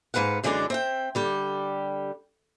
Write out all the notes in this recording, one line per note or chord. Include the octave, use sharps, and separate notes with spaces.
G#2 F3 B4 F5 F#5
F#2 D3 E3 G#3 D4 D5
C4 E5 G5
D3 G3 G4